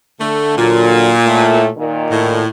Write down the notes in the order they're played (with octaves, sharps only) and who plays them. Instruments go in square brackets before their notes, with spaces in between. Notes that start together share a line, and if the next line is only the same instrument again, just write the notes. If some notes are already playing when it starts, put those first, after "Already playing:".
[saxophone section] D3 A3
[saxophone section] A#2 [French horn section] D3 F#3
[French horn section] A2 A3
A#2 D#3
[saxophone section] A2